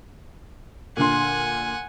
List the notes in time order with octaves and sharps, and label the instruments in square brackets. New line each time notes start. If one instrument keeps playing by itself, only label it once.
[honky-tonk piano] A#2 D3 C6 [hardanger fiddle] F#5 G#5